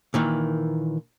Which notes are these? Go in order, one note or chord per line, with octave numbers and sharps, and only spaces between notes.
A#2 D#3 E3